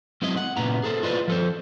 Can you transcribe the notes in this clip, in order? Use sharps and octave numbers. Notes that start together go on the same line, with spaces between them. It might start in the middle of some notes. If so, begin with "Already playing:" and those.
F#3 G#3 C4 E4 C5 D#5
F#5
A#2 C#3 B3 E4 A#5
G#4 A4 C5
E4 F4 B4 C5 D5 D#5
F3 A4 C5